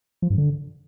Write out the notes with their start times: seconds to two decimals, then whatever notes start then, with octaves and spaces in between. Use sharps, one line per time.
0.22 F3
0.30 G2
0.38 D3